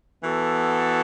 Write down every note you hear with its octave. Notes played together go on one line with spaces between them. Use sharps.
E3 B3 F#4 A4